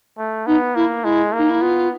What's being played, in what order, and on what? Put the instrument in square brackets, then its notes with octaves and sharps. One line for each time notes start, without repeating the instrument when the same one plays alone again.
[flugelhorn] A3
[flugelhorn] B3 [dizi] D#4
[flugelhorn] A#3 [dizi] E4
[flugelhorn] G#3 [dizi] E4
[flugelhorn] A#3 [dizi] D#4
[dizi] E4
[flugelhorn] B3 [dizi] F4